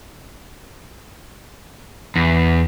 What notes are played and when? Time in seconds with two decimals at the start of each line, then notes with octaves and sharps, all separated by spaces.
2.16 E2